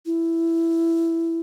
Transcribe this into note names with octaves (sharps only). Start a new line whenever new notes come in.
E4